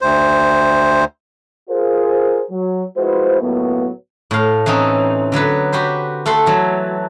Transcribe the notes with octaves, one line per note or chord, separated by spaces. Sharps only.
D2 C5
F4 G#4 A#4 C5
F#3
F3 G#3 E4 F#4 B4 C5
C#2 A2 F#3 A#3 B3
A2 F5
E3 C4 C#4 D#4
D3 F#3 B3 B4
F#4 G4 B4 C5
A3 A4 F#5 C6
E3 F#3